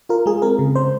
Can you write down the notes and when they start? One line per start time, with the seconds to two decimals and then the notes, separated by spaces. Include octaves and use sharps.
0.09 F4 A#4
0.26 G#3 G#4
0.42 C4 A#4
0.59 C#3
0.76 G#3 C5